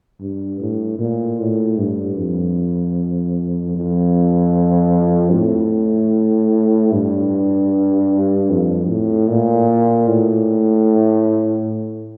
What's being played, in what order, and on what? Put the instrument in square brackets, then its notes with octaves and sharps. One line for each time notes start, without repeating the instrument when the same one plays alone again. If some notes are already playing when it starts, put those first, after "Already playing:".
[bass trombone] G2
A2
A#2
A2
G2
F2
F2
A2
G2
F2
A2
A#2
A2